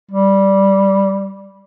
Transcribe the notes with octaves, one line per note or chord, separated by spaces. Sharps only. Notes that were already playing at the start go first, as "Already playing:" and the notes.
G3